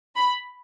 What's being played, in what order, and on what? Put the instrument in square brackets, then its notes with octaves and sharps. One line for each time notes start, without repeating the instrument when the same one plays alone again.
[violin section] B5